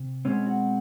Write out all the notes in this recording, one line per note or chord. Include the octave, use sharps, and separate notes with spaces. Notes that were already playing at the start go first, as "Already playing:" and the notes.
Already playing: C3
B2 G#3 C4 C#4
F#4